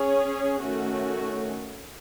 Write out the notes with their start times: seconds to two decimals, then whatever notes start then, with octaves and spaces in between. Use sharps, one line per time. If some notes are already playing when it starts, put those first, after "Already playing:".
Already playing: C#4 G#4 C#5
0.63 D#3 A3 C#4 F#4